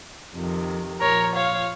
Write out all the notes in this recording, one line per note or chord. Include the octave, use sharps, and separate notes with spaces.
F2 C3 D#3
A#2 F3 A#4 C#5
C#5 F5